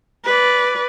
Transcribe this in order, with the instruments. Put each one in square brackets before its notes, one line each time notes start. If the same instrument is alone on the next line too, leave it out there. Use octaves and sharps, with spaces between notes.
[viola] B4 D5